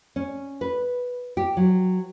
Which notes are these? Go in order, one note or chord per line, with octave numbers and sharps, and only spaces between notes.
C#4
B4
G4
F#3